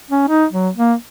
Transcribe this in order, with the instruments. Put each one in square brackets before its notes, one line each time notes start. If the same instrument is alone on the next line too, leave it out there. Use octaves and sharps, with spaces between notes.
[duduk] C#4
D#4
F#3
A#3